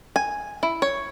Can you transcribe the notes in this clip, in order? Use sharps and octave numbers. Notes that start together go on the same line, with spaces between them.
G#5
E4
C#5